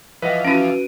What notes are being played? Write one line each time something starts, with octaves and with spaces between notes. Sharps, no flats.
E3 F3 B4 D#5 F#5
C#4 E4 F#4 B4 D7 D#7